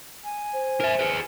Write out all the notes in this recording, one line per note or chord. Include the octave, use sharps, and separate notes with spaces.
G#5
C5
A#4 E5
G#4 B4